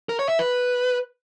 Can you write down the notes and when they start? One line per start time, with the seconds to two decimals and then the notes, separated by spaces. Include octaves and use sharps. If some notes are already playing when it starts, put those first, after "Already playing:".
0.09 A#4
0.19 C#5
0.29 E5
0.39 B4